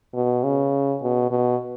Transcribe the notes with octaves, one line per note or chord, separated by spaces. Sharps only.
B2
C#3
B2
B2